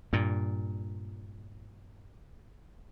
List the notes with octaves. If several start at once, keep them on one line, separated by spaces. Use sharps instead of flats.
G2 A#2